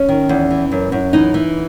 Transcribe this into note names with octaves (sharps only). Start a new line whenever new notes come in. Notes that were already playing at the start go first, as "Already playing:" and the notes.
Already playing: C#4
D#3
E2
E3
F#2
F#2
E3 D#4
E3